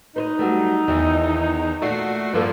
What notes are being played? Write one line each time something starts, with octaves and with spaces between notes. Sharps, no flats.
D#4 B4 C5 D#5
F#3 G3 A3
E2 D#3 E3
A#2 A3 F#4 C7
G2 F3 A#3 A4 B4 D5